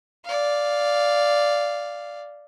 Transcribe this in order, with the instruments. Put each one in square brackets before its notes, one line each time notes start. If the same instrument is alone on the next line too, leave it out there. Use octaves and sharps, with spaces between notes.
[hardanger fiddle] D5 F5